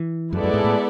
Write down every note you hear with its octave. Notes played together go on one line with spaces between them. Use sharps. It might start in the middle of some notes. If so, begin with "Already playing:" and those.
Already playing: E3
F#2 G#3 B3 E4 A4 D5
F#2
G#2
A2